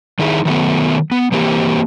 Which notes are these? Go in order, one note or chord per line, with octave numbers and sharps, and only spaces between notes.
D#3 D#4 E4 G#4
D#3 F#3 A3 B3
B3
E3 A#3 C4 G4